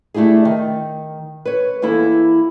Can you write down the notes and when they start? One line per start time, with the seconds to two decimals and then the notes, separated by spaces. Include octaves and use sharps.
0.14 A3 D4 E4 G4 G#4
0.45 D#3
1.45 B4 C#5
1.82 E2 A#3 E4 A4